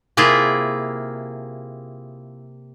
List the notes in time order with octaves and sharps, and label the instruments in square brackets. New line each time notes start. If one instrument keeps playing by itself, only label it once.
[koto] C3 A#3 E4 F4 G#4